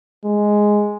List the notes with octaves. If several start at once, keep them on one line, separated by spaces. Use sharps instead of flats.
G#3